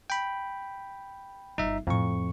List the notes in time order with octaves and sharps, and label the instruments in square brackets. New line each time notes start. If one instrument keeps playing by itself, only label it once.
[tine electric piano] G5 B5
[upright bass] G1 [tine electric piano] D#4 E5
[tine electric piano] F2 C#6 [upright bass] A2 C4